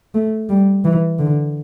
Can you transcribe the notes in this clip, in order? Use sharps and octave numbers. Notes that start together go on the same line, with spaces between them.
A3
G3
E3
D3